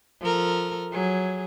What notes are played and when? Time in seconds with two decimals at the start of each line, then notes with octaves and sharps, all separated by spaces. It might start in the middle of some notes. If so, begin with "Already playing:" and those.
0.21 F3 A4 A#4
0.92 F#3 G#4